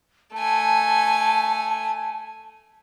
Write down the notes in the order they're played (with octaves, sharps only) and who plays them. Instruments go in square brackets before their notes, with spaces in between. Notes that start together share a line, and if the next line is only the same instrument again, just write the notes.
[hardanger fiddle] A3 G#5 [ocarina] A5